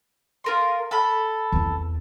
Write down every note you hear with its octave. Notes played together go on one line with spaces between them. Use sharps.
F4 A#4 C6
A4 B5
E2 C4